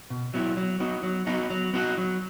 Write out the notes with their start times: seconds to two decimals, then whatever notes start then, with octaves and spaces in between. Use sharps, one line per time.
0.10 B2
0.34 F#3 B3 E4
0.57 F#3
0.80 B3 D#4 F#4
1.03 F#3
1.27 B3 D#4 F#4
1.50 F#3
1.74 B3 D#4 F#4
1.98 F#3